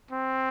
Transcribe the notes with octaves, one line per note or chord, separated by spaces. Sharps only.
C4